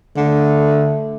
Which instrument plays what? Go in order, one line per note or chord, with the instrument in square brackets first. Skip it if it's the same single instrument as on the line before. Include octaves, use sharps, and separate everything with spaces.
[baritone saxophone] D3 [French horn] A3